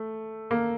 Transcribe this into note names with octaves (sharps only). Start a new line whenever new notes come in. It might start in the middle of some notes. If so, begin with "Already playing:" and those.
Already playing: A3
A#3